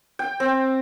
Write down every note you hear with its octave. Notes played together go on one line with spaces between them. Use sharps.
G5
C4